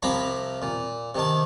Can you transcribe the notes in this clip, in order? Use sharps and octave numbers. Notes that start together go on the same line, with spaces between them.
C2 C3 F3 F5 A#5 B5
A#2
C3 D#3 A5